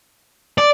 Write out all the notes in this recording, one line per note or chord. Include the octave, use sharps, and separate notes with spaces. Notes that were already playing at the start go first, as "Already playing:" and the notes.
D5